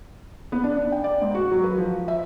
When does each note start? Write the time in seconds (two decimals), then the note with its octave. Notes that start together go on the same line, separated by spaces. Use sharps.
0.52 B3
0.64 D4
0.77 D4
0.92 G5
1.04 D5
1.22 G#2
1.35 F#4
1.51 F#3
1.64 B4
1.78 F3
2.08 E5